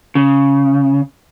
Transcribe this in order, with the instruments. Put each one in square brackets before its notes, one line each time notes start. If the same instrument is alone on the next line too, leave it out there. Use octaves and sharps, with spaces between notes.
[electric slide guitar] C#3